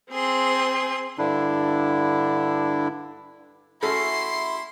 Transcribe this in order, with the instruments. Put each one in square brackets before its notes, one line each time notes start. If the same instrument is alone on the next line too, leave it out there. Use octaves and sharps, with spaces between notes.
[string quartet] C4 G#4 C6
[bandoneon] G2 D3 D4 E4
[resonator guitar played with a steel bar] A3 C#4 F#4 [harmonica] E4 C6 [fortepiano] A4 [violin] C7